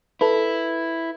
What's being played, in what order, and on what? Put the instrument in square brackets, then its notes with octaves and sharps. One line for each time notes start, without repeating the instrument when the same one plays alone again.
[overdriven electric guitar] E4 [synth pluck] A4 B4